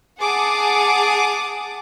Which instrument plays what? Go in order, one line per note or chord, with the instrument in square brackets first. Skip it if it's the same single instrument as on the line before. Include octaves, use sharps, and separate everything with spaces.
[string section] G#4 F#5 A5 D6 D#6